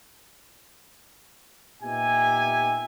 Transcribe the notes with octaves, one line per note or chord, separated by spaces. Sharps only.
A#2 B3 D#4 G4 E5 G#5